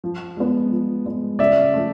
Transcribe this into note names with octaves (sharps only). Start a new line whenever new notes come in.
F3
G#3 B3
F3
G#3 B3
C#3 D5 E5
F3 A3